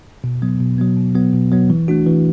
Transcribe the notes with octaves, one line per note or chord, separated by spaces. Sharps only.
B2
F#3 B3
B2
F#3 B3
B2
F#3 B3
B2
F#3 B3
E3
A3 D4 F#4
E3